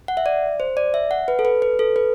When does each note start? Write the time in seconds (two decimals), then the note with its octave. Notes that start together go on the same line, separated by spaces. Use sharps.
0.08 F#5
0.17 E5
0.26 D5
0.60 C5
0.77 D5
0.94 E5
1.11 F#5
1.28 B4
1.39 A4
1.45 B4
1.62 B4
1.79 A4
1.96 B4